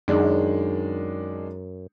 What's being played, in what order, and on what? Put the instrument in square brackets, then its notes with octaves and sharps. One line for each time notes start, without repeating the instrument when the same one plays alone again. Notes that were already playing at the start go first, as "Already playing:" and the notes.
[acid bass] F#2 [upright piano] D#3 G#3 D4